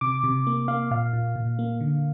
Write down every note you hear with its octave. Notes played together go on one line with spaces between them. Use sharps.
C3 D6
C3
A#3
A#3 F5
A#2 F5
A#2
A#2
A#3
D3